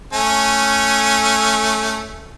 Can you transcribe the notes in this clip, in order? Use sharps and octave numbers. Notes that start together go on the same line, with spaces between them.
A3 C#4 G#5